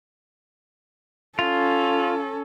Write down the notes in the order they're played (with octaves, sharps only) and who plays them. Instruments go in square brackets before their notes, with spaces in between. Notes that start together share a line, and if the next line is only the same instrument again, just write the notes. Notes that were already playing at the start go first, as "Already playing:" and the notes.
[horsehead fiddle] C#4 A4 [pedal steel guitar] F4